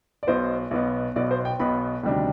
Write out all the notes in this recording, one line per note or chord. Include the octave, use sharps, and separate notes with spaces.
D5
B1 B2 B3 C5
B1 B2 B3
B1 B2 B3 D5
C5
G5
B1 B2 B3 B5
D2 C3 D#3 G3 D4